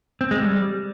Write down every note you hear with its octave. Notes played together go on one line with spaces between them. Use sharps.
C4
G#3
G3